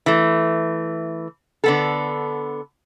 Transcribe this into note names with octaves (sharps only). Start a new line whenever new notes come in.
E3 A3
D3 B3 A4